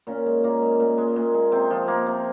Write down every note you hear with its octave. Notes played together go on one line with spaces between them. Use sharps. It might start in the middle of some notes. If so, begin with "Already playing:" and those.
A#2 C#4
G#3
A#2 A#3
G#3
A#2
G#3
A#2
G#3
C3 C4
F3
A#3
C3